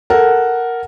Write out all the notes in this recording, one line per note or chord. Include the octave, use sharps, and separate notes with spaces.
A4 A#4 F#5